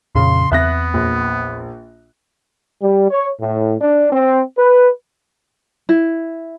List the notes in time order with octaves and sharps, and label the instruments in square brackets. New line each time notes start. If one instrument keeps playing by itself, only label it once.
[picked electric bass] F2 A#2 [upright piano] C#3 [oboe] C6
[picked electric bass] E2 C4 [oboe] B3 [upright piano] E5 F#6 A#6
[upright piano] A#1
[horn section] G3
C#5
A2
D4
C4
B4
[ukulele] E4